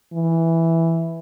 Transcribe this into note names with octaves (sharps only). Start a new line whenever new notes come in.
E3